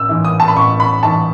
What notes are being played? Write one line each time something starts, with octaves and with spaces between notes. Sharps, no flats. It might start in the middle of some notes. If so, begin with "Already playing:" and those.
Already playing: A1 E6
G#2 E3
D#6
A5
B5
A1 C#6
B5
G#2 E3 A5